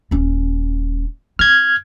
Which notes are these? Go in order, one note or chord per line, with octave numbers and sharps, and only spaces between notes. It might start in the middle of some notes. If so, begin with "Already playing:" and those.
D#1 C#4
E4 F6 G#6